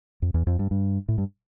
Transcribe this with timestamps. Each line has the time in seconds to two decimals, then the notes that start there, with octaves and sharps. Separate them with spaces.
0.22 F2
0.34 E2
0.47 F2
0.59 G2
0.71 G2
1.08 A2
1.18 G2